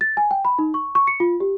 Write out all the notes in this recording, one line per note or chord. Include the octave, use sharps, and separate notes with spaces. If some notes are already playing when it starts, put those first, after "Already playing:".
A6
G#5
G5
B5
D#4
C#6
C#6
C#7
F4
G4